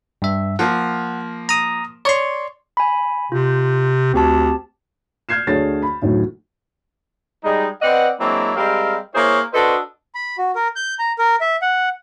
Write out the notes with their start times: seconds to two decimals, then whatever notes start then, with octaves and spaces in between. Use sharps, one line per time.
0.22 G2 E5
0.59 F3 A#3 F#5
1.49 A#5 D#6
2.05 C#5 D5 C6
2.77 G#5 B5
3.32 C3 F4
4.14 D2 C4 G4 A5
5.29 F6 G6 G#6 C7 E7
5.47 D2 D3 A3 G#4 C#5 A6
5.82 B5
6.02 D2 A2 D#3 F#3
7.44 G3 G#3 D#4
7.82 C4 B4 D5 D#5 F#5
8.19 F#3 G#3 A#3 C4 D4 E4
8.56 G3 G#3 C4 G4 A#4 F5
9.14 A#3 E4 G#4 C5 C#5
9.53 D4 F#4 A4 B4 C5 D#5
10.14 B5
10.38 F#4
10.55 A#4
10.76 G6
10.99 A#5
11.18 A#4
11.41 E5
11.62 F#5